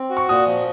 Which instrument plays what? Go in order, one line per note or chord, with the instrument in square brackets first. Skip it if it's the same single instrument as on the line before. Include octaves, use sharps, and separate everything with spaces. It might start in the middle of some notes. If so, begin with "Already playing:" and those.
Already playing: [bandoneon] C4
F#4
[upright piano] C#6
[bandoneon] A#2 [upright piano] D#6
[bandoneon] F3